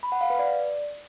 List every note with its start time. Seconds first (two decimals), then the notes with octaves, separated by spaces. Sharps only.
0.03 B5
0.12 F#5
0.21 F5
0.30 B4
0.39 D5